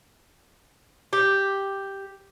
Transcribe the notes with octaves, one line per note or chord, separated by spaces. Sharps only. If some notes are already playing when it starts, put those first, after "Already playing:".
G4